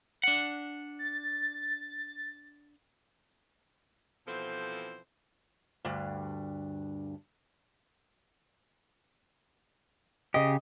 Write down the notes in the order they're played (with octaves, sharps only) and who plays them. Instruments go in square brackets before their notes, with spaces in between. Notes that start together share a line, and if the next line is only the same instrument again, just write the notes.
[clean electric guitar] D4 F#5
[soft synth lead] A6
[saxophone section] B2 E3 F3 C4 A4 C5
[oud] D2 G2
[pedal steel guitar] C#3 G4 [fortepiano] D#5